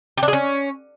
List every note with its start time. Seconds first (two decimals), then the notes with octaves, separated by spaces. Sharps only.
0.18 G4
0.23 D4
0.28 G#4
0.33 C#4